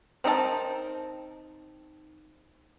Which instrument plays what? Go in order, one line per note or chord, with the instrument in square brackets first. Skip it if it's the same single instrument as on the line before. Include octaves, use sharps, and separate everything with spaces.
[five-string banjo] C4 D#4 A#4 D#5 A5